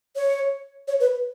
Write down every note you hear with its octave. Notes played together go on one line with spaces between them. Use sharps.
C#5
C#5
B4